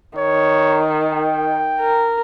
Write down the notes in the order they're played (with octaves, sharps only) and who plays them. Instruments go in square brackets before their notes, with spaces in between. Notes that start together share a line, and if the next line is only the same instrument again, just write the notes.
[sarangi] D#3 [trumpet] C#5
[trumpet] G5
[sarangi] A#4